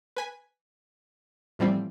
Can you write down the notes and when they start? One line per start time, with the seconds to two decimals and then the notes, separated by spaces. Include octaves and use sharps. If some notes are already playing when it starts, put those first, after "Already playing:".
0.16 B4 G#5 B6
1.59 A2 E3 F3 G3 C4